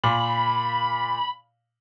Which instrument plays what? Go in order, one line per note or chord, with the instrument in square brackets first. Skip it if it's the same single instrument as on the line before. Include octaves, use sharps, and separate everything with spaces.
[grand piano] A#2 [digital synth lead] B5